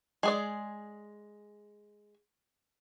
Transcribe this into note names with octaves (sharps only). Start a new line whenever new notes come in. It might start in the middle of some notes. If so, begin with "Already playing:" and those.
G#3 G#4 D5